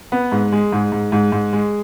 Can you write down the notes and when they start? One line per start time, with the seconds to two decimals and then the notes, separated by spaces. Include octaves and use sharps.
0.12 B3
0.32 G#2
0.52 G#3
0.73 G#2
0.92 G#2
1.12 G#2
1.32 G#2
1.53 G#3